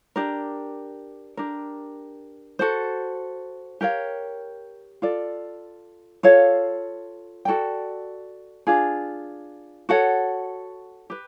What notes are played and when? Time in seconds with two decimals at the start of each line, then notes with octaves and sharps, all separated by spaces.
0.16 D4 G4 A#4
1.37 D4 G4 A#4
2.59 F#4 A4 C5
3.81 G4 A#4 C#5 F5
5.02 F4 A4 D5
6.23 F4 A4 C#5 F5
7.45 F#4 A4 D5 G5
8.67 D4 F4 G#4
9.89 F#4 A4 C#5 F#5
11.10 G4 B4